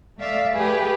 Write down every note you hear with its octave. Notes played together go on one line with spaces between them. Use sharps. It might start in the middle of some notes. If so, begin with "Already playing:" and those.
A3 D5 E5 F5
A3 G4 G#4 B4